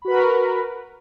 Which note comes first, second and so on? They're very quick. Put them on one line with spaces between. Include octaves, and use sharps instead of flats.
B5 F#4 B4 A#4